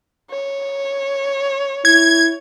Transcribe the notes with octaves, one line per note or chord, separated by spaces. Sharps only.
C#5
E4 G#6